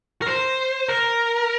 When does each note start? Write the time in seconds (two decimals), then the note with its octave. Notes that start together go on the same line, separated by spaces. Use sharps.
0.22 A#4
0.26 C5
0.89 A#4